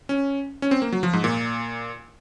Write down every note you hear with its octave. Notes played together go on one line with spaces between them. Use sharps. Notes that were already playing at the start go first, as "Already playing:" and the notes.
C#4
C#4
C4
A#3
F#3
F3
G#2
A#2